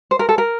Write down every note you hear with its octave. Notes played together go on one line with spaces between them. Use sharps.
C5
A#4
A4
A#4